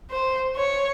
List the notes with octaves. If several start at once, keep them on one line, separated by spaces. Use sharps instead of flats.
C5
C#5